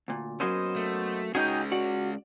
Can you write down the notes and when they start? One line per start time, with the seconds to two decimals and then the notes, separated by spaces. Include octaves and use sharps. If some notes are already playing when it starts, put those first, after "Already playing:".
0.08 D2 A#2
0.40 F#3 A#3 B3 C#4 C5 D#5
0.76 A3
1.35 G#3 C#4 D#4 F#4 G#4 G5 G6
1.72 F#4 D5